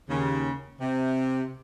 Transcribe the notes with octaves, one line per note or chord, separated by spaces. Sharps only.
D#2 C#3
C3